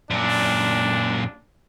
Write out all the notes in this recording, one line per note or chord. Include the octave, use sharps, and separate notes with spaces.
F#2 A#2 D4